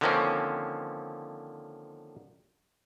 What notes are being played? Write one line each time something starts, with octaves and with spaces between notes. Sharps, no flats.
D3 D#3 F3 A#3 C4 C#4